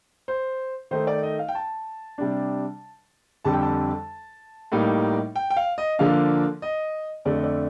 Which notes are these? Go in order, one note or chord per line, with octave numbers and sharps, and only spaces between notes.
C5
D#3 A3 D#4 C5
D5
D#5
F5
G5
A5
C3 G3 D4
F2 D3 G3 A5
G5
A5
A2 G3 A#3 D#4
G5
G5
F5
D#5
D3 F3 A#3 D4 F5
D#5
F2 D3 A3 D5
D#5
D5